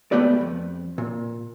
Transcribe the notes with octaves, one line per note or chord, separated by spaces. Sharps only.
C#2 B2 A3 B3 G4 D5
F2
A#2